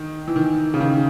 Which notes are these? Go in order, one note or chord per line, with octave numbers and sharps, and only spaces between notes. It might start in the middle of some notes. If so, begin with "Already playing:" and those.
Already playing: D#3
E3
D#3
C#3
D#3